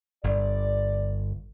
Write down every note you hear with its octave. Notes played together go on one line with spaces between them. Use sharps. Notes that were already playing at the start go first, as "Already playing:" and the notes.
G1 D5